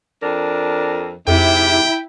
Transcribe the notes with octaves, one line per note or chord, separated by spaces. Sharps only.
F2 D4 A#4
F2 G#2 C3 E4 G4 G5